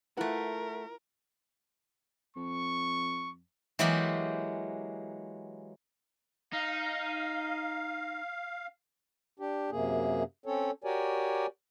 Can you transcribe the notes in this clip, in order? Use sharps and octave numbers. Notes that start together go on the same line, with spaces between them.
A3 E4 F4 A#4 B4 F#5
F2 C#6
E3 F#3 G#3 A#3 G4 B5
D#4 F5
D4 G4
F#2 C3 A#3 G#4
C4 C#4 A4 C#5
F#4 G4 A#4 C#5 D5 G#5